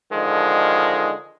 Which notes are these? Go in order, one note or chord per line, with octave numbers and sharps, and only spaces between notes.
D3 D#3 F3 G#3